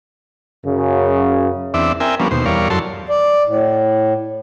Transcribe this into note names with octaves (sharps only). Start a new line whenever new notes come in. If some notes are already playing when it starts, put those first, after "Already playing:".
F#2 C#3
E2 C4 D4 D5 E5
C4 A#4 E5 G5 G#5
F3 G3 A#3 B3 C#4 D4
D#2 B2 C5
E2 G3 A#4 C#5 D5 F5
F#2 F#3 A4 A5 C6
D5
A2